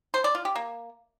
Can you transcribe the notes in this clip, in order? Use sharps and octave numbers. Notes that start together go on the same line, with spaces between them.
C5
D5
F4
G4
A#3